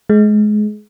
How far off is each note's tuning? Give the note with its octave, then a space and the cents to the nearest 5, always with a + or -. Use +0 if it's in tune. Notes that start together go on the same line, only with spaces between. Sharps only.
G#3 +25